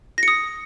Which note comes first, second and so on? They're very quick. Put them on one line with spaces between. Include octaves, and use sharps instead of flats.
A#6 C#7 D#6